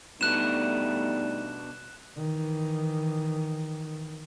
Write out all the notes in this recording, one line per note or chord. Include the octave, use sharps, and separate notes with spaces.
B2 G3 A3 B3 D4 D#4 F#6 E7
D#3 E3